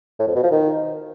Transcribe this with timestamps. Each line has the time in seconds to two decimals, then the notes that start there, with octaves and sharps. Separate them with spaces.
0.19 A2
0.27 F2
0.35 B2
0.43 F3
0.51 D#3